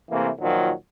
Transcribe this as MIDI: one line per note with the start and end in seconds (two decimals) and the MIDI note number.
0.10 0.29 48
0.10 0.29 52
0.10 0.29 57
0.10 0.29 58
0.40 0.70 46
0.40 0.70 51
0.40 0.70 53
0.40 0.70 54